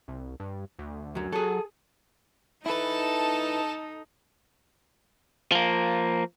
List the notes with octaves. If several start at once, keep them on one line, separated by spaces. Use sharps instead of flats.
C2
G2
D2
F#2 F#3
F#3 G#4 A4
D#4 E4 A4 B4 A5
F3 A#3